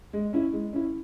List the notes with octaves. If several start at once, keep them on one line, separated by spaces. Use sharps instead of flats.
G#3
C#4 E4
G#3
C#4 E4